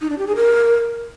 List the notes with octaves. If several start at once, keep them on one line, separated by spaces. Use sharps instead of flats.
D#4
D4
G4
G#4
A#4